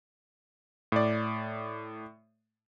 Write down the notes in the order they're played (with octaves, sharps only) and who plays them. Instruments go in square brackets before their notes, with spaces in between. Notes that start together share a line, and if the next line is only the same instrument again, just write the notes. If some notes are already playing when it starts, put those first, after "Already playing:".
[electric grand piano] A2 D5